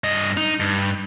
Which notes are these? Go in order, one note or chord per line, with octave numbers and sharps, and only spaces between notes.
G2 D#5
D#4
G2